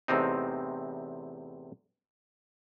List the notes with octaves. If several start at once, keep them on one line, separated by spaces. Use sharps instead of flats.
E2 A2 C3 C4 D#4